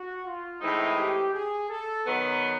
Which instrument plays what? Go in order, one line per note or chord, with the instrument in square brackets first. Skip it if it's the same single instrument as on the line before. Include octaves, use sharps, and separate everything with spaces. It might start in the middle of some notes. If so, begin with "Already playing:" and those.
Already playing: [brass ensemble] F#4
F4
[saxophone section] A2 E3 G#3 C4 D#4 [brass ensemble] E4
[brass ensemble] G4
G#4
A4
[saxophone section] D#3 F#3 B3